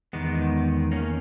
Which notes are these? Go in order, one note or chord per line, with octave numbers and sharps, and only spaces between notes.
E2 D#3 G#3 B3
A#3 C#4